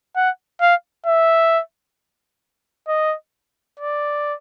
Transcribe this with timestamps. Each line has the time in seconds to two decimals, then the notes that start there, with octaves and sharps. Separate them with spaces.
0.16 F#5
0.61 F5
1.06 E5
2.88 D#5
3.80 D5